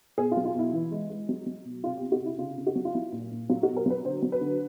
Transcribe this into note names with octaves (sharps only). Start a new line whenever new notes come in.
B2 G#4
F4
F#3
F4
B2 E4
E3
G#3
G#3
F#3
F#3
B2
C3 F4
G4
C3
F#4
C3 E4
C#3 F4
C#3
F#4
F#3
F4
F#3 E4
A#2
A#2
F#3 F4
F#4
B2
A#4
F#3 B4
D3 C5
F#3
B4
D3